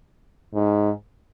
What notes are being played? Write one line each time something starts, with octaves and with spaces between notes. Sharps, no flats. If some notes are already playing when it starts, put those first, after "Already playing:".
G#2